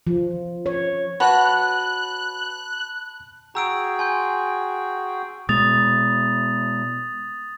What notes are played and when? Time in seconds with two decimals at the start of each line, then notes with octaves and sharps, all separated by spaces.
0.07 F3
0.66 C#5
1.20 F#4 B4 C#5 A5 B5 F#6
3.55 F#4 G#4 G5 A#5 E6 D7
3.99 G#5 C6 G6
5.49 B2 G#3 D#6 A6 F7